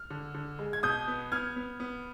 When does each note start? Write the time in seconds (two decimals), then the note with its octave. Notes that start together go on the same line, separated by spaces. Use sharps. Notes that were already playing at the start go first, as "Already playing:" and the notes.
Already playing: F6
0.10 D3
0.34 D3
0.59 G#3
0.73 G#6
0.83 B2 D#6 G6
1.08 B3
1.32 B3 F6 G#6
1.56 B3
1.80 B3